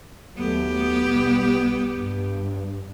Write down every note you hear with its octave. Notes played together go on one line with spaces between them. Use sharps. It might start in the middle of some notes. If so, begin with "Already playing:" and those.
D#2 F#3 A3 B3 G4
B1 G3
G2